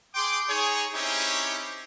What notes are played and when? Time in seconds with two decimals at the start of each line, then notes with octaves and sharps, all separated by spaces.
0.14 G#4 G5 C6 D6
0.49 D#4 G#4 C#5
0.94 C4 C#4 D#4 E4 G4 C#5